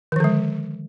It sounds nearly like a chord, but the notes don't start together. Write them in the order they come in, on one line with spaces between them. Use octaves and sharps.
D#3 F3 D3 G#3